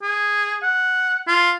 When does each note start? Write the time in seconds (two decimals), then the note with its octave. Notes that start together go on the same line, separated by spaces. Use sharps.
0.02 G#4
0.63 F#5
1.28 F4